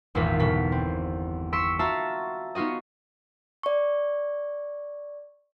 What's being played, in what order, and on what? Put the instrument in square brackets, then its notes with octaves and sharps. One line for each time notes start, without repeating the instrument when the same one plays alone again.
[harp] G#1 E2 A#2 E3 F4 B6
G1 B2 E3 B6
C4
C6 C#6 E6 B6 C#7 D7
F4 F#4 E5 A5 A#5 E6
B3 D#4 F4 F#4 D#5
[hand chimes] D5 C#6